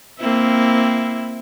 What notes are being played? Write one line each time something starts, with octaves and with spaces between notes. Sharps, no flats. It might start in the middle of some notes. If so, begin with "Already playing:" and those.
A#3 C4 E4